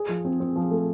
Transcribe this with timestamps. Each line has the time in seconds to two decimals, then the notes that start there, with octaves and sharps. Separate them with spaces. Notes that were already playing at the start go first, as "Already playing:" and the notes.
Already playing: G#4
0.08 F3
0.25 C4
0.40 C4
0.56 F3
0.71 A3